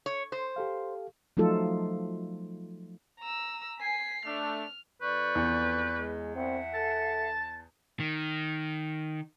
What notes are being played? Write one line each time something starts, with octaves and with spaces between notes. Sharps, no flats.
C#5
C5
G4 A4 F5
F3 F#3 A3 D#4 F4 A4
A#5 E6
G#5 B6 C7
A3 D4 F6
F2 B4 D5 C#6 G6
E2
G#3
C4 E5 F#5
A4 A5
D#3